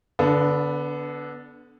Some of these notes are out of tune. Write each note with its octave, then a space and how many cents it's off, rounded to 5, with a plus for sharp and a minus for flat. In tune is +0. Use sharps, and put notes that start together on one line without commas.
D3 -20 B3 +0 D4 +15